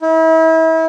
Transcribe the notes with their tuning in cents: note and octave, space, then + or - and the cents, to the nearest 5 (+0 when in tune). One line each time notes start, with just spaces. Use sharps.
E4 -35